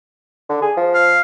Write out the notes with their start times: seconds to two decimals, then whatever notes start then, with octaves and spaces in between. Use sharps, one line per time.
0.49 D3
0.62 G#4
0.77 F3
0.94 F5